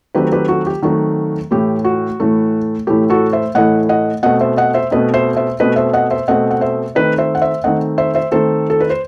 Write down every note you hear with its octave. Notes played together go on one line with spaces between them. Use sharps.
D#3 F#3 A3 C4 G4 B4
G4 B4
F#4 A4
G4
D#3 F#3 A3 C4 F#4
A2 E3 A3 G4
F#4
A2 E3 A3
A2 E3 A3 G4
F#4 A4
C5 E5
A2 E3 A3 D#5 F#5
D#5 F#5
B2 A3 C4 D#5 F#5
C5 E5
D#5 F#5
C5 E5
B2 A3 C4 B4 D#5
C5 E5
C5 E5
B2 A3 C4 B4 D#5
C5 E5
D#5 F#5
C5 E5
B2 A3 C4 D#5 F#5
F#5
C5 E5
D#3 A3 C4 B4 D#5
C5 E5
F#5
C5 E5
D#3 A3 C4 D#5 F#5
C5 E5
C5 E5
D#3 A3 C4 A4 C5
A4
B4
C5